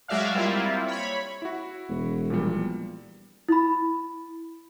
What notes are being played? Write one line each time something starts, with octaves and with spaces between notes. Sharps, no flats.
F#3 G#3 F#4 D5 E5 F5
G3 A#3 C4 E4 F4
C#5 B5
E4 F#4
E1
A#2 F3 G3
E4 B5